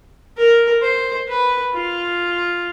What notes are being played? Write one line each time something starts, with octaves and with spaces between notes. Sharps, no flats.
A#4
C5
B4
F4